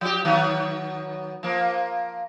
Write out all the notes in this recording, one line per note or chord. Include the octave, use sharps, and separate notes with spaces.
F3 G4
D#3 F#3 B3
F3 A#3